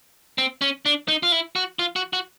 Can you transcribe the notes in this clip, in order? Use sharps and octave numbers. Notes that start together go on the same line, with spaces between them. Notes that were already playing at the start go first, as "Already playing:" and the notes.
C4
C#4
D4
D#4
F4
E4
F#4
F4
F#4
F#4